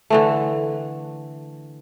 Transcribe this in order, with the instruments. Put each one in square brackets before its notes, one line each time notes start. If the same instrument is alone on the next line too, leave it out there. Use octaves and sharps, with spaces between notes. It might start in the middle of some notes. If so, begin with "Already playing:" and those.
[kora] D3 E3 A3